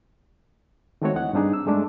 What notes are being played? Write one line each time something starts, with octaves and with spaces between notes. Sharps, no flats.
D#3 G#3 A3 C4 F#4 C#5
D2 E3 D#5 F#5
G2 C4 D4 D#4 G#4
E6
G2 G#3 A3 D4